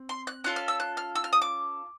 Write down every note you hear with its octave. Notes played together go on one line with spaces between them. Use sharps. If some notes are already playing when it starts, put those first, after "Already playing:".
Already playing: C4
C6
F#6
C#4 F4 A4 F#6
F6
E6
F#6
F6
E6
F6
D#6
D6